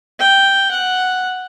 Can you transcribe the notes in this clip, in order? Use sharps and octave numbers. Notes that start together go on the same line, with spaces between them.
G5
F#5